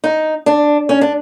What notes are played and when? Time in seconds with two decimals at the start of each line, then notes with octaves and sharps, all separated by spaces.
0.04 D#4
0.46 D4
0.89 C#4
1.01 D4